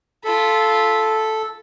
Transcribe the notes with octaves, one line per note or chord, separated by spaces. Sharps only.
F4 A4 B5